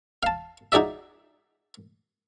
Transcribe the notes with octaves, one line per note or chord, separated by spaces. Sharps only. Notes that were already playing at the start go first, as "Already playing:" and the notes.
F5 A5
D#4 F#4 G#4 D5 E5